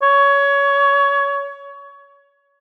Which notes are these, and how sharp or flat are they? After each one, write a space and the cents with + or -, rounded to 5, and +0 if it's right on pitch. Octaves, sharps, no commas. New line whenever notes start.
C#5 +20